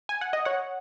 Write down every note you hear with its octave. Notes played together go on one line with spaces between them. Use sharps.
G#5
F#5
D#5
C#5 F#5